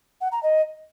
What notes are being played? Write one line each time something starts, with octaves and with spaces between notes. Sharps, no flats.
F#5
A#5
D#5